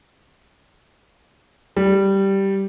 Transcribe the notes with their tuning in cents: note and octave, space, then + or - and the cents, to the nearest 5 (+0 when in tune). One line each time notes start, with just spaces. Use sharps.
G3 -5